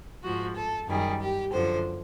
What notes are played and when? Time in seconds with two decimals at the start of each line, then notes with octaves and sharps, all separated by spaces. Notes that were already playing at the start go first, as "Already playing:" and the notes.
0.23 G#2 F3 F#4
0.56 A4
0.88 F#2 D#3 G3 G#4
1.20 G4
1.52 F#2 D3 F3 C5